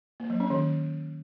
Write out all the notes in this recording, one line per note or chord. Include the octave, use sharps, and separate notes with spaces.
A#3
F#3
C#4
D#3